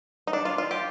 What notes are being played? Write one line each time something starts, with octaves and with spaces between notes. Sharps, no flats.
D#4
D4
F4
F4
G4